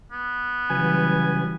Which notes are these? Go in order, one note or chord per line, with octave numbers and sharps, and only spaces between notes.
B3
C#3 E3 F#3 G3 B4 G#5